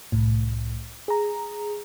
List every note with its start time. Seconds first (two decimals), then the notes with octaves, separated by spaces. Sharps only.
0.12 C2 A2
1.08 G#4 A#5